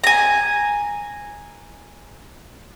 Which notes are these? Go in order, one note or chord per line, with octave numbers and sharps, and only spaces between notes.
G#5 A#5